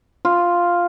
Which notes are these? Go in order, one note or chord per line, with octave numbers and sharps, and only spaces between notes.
F4